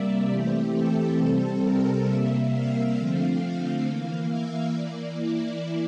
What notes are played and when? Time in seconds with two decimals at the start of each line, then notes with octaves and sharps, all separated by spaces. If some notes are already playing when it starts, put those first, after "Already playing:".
Already playing: C3 G3 A#3 D5 E5
0.30 E3 A3 C4 G4
0.75 A4
1.20 C3 G3 C4
1.64 A#4
2.08 C3 G3 A#3 E5
2.53 F5
2.97 D3 F3 A3 C4 F5
3.42 F5
3.86 E3 A#3 F5
4.31 E5
4.75 E3 A#3 D5
5.18 E4